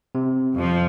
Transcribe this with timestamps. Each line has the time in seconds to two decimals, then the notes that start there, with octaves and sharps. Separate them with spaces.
0.15 C3
0.54 F2 F3